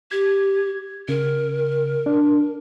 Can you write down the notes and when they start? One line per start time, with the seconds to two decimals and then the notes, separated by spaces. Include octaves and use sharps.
0.11 G4 G#6
1.09 C#3 A#4
2.06 D4